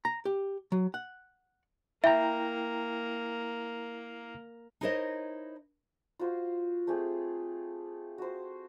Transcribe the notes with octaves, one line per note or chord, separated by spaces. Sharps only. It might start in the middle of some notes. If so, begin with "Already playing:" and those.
A#5
G4
F#3
F#5
A#3 E4 E5 G5 A#5
D#4 E4 A#4 C5 C#5 D#5
F4 F#4 C5
A3 C4 G4 G#4
F#4 C5